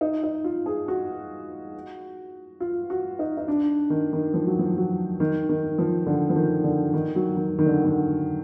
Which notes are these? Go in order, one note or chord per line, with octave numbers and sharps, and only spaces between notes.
D#4
D#4
F4
G#4
F#4
F4
F#4
D#4
D#4
D4
D#3
D#3
F3
F#3
F3
F#3
D#3
D#3
F3
D3
F3
D#3
D3
D#3
F#3
D#3
D#3
D3
D3